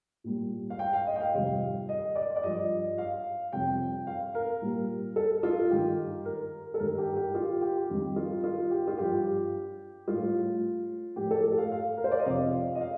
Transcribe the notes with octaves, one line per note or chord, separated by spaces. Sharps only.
A#2 G3
F5
G5
F5
D#5
G5
F5
F2 C3 D#3 G3
D#5
D5
D5
G2 F3 D#5
F5
F2 C3 G3 G5
F5
A#4
A#2 G3
A4
F4
G2 D#3 G3 G4
A#4
A4
G2 D#3 G3 A#4
G4
G4
F4
G4
F2 D#3 G3
F4
F4
G4
F4
G2 F3 G4
A2 G3 F4
A2 F3 G4
A4
A4
F5
F5
A#4
C5
D5
D#5
F2 C3 F3 F5
D#5
F5